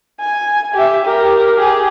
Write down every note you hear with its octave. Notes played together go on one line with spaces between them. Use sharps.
G#5
G4 E5
G4 A#4
G4 G#4